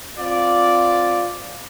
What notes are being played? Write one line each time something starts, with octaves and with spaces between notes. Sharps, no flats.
C4 F4 D5